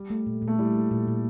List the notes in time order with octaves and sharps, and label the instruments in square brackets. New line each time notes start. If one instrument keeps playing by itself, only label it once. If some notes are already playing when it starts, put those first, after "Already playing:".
Already playing: [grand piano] G3
[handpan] A3
A#2
A#2
[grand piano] A3
[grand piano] G3 [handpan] E4
[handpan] A3
A#2
A#2